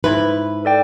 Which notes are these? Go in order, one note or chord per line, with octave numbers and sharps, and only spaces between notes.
G#2 E4 B4
A4 D5 G5